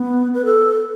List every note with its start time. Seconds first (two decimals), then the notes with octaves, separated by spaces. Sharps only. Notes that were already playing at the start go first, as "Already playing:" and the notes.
Already playing: B3
0.34 B4
0.45 A4